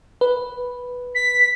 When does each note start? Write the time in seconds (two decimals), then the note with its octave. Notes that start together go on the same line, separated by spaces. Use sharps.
0.21 B4
1.15 B6